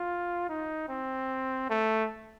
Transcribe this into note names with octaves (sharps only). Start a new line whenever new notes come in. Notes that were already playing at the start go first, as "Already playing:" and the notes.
Already playing: F4
D#4
C4
A3